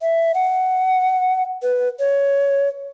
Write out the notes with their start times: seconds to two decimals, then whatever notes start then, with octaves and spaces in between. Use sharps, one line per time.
0.01 E5
0.34 F#5
1.62 B4
1.99 C#5